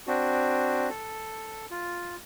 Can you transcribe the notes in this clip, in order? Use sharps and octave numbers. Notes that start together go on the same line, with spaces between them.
C4 D4 F#4
A4
F4